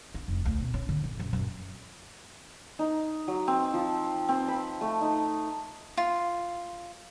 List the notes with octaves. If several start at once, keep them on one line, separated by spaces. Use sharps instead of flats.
D4
F1
D2
B2
C#4
D3
D3
F#2
F#2
D#4
F#3
C4
F3
C4
B5
A3
D#4
F4